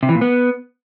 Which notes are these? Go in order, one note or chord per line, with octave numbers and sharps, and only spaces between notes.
C3
E3
A#2
B3